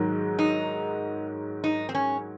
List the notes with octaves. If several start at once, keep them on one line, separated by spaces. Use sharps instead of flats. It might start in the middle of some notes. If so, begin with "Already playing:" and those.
Already playing: G#2 D#3 F#3
D#4
D#4
C4
C#4